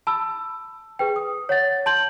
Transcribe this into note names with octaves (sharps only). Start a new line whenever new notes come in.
A5 B5 E6
G#4 B4 G5
D#6
C#5 F#5 A6
A5 C6 G6 F#7